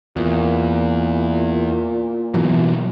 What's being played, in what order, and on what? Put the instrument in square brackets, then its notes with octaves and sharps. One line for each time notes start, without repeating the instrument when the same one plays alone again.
[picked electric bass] E2 [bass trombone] A#2
[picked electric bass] B2 E3 F#3